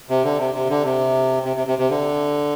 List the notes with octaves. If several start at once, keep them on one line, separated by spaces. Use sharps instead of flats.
C3
D3
C3
C3
D3
C3
C3
C3
C3
C3
D3